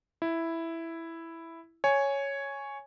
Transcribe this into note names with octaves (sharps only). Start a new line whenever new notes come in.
E4
C#5 G#5